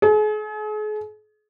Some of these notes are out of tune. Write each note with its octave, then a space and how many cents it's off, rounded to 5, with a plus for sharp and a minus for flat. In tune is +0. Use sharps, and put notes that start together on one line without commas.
G#4 +40